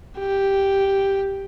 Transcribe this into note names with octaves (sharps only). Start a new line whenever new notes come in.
G4